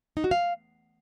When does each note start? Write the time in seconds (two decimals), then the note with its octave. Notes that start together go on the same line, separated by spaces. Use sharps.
0.17 D#4
0.24 F#4
0.31 F5